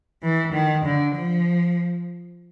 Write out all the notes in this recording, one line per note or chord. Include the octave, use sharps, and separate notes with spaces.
E3
D#3
D3
F3